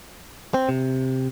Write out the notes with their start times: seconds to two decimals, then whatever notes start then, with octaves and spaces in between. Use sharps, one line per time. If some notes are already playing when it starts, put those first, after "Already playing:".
0.54 C4
0.69 C3